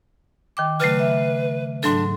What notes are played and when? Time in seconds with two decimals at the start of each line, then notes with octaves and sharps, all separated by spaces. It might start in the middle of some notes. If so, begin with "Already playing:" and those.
0.57 D#3 G5 D6
0.80 C#3 F#3 A3 B4
0.99 E5
1.83 G#2 F#3 D4 A4